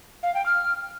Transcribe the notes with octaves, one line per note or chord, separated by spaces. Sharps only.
F5
G5
F6